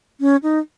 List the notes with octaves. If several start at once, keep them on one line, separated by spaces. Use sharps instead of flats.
C#4
D#4